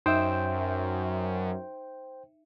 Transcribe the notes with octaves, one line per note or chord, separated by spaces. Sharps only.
F#2 D#4 C5 E5 G5